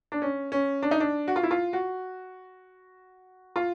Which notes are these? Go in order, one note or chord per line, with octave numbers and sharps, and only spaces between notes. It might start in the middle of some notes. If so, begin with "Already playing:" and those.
D4
C#4
C#4
D4
D#4
D4
F#4
F4
E4
F4
F#4
F4